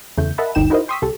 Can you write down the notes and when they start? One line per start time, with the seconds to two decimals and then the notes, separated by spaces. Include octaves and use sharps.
0.17 E2 C#3 A3 G6
0.38 A#4 D#5 E5 F#5 A5 B5
0.55 G1 D2 D#4 G5 E7
0.70 D#4 E4 F#4 A#4 C5 D#5
0.88 G5 C6 C#6 D#6 E6 B6
1.02 C2 G4 A4